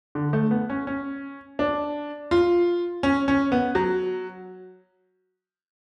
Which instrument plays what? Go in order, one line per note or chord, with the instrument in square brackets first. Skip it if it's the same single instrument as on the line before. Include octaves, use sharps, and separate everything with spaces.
[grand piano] D3
A3
B3
C#4
C#4
D4
F4
C#4
C#4
B3
F#3